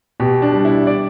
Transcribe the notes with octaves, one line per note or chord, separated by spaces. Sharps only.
B2 G4
D4
G3
E4
D5